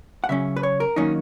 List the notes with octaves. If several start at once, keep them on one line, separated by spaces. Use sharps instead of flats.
F#5
C#3 F#3 C#4 E5
B4
C#5
A#4
D#3 F#3 A#3 C#4 D#4